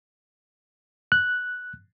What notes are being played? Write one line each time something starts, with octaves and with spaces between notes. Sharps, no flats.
F#6